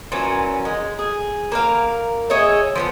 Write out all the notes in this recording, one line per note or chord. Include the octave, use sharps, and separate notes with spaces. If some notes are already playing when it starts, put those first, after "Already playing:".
A#2 E3 F#3 C#4
G#3
G#4
A#3 A#4 F5
G#4 C#5 D#5 E5
F3 A#3 B3